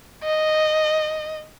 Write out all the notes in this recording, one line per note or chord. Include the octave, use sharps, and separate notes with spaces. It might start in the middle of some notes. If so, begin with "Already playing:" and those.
D#5